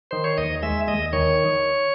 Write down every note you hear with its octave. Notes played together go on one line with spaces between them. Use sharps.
D#3 C5
C#5
D#2 D#5
G#3 E5
D#2 D#5
D#3 C#5